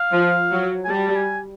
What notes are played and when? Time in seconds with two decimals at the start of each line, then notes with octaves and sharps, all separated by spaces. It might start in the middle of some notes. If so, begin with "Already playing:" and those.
Already playing: F5
0.12 F3
0.51 F#3
0.85 G#5
0.90 G3 A5
1.16 G#5